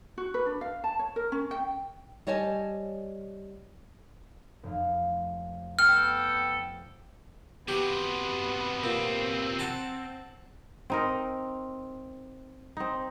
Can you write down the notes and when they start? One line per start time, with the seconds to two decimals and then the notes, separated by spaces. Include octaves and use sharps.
0.18 F#4
0.34 B4
0.46 D4
0.61 F5
0.84 A5
0.99 C#5
1.16 A#4
1.32 C#4
1.51 G5
2.27 G3 C#5 D#5 G#5 A5
4.63 F1 F5
5.79 B3 A4 G5 F6
7.68 C3 F#3 B3 G4
8.84 A#2 C4
9.59 F#5 A5 A#5
10.90 C4 D#4 A#4
12.77 C4 D#4